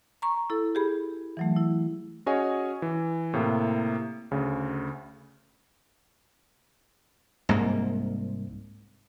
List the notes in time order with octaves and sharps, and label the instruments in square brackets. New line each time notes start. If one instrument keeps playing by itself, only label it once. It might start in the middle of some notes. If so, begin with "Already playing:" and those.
[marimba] A#5 C#6
E4 A4
G4 G#4 B5
E3 F#3 A3
E4
[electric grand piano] C#4 F#4 G#4 C#5 D#5 G#5
E3
A2 C3 A#3
D2 C#3
[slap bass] C2 G#2 A#3